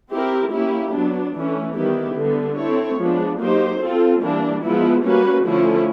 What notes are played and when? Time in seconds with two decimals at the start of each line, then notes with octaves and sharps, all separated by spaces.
0.10 C4 E4 G4 A#4
0.51 A#3 C#4 E4 G4
0.92 F#3 B3 D4
1.33 E3 A3 C#4
1.75 D#3 G3 B3 E4 G4
2.15 D3 G3 B3
2.56 C4 E4 A4 C#5
2.98 F3 G#3 B3 D4
3.39 F#3 A#3 D#4 G4 C5
3.80 C4 F4 A4
4.21 E3 G3 A#3 D4
4.62 F3 G#3 B3 E4
5.03 G3 A#3 C#4 F#4 B4
5.44 D3 F3 A3 C#4 E4